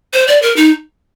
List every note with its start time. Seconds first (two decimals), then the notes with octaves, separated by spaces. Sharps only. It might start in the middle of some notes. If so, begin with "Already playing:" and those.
0.13 C5
0.28 D5
0.42 A#4
0.56 D#4